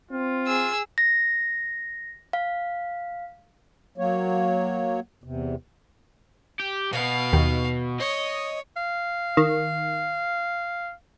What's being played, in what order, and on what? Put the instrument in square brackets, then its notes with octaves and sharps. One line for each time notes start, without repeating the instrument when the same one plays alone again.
[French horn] C4 [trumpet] F4
[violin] G#4 E6
[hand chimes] A#6
F5
[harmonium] F#3 A#3 C#5
E2 C3
[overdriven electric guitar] G4
[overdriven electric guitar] B2 [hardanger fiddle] B3 F5
[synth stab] D#2 D#3
[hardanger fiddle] C#5 [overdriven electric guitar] D#5
[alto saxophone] F5
[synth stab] D#3